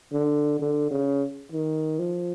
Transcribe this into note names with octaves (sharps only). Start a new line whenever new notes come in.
D3
D3
C#3
D#3
F3